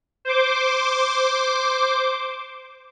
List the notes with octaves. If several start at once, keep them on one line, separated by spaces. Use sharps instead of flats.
C5 D6